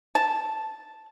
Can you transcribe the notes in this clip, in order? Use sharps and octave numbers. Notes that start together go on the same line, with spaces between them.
A5